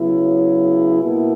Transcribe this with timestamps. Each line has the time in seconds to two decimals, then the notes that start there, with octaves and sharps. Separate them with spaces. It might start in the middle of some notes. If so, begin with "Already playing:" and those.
Already playing: C#3 F#3 B3 E4
1.02 B2 A#3 E4